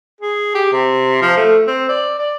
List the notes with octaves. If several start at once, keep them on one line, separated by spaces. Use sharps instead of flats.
G#4
G4
C3
F3
A3
C4
D5
D5